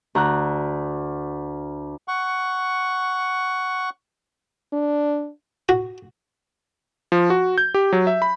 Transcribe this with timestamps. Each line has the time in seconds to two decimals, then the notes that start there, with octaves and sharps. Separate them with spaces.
0.15 D2 A#5 F#6
2.08 F#5 C#6
4.73 D4
5.69 F#4
7.12 F3
7.30 F#4
7.58 G6
7.74 G4
7.93 F#3
8.07 E5
8.22 B5